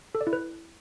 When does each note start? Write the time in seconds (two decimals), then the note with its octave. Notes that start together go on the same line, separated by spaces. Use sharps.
0.15 A4
0.21 D5
0.27 E4
0.33 B4